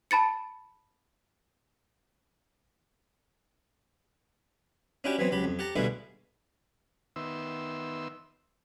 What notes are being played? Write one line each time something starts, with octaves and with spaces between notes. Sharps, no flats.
A5 B5 A6 C#7
C#4 D4 E4 F#4 G4 G5
E3 F#3 B3 C4
C#2 F#3 G4 B5
F2
G4 F#5 A5 A#5
G2 B2 D3 G#3 A3 E4
D#3 B3 E5 C6 E6